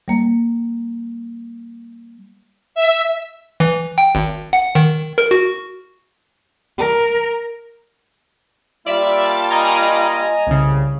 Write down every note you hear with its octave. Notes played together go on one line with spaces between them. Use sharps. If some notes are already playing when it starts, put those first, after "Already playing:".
G3 A#3
E5
E3
G5
G#1
F#5
D#3
A#4
F#4
A#4
G3 A#3 F4 D5 E5
A5 A6
D#5 G#5 A#5
C2 C#3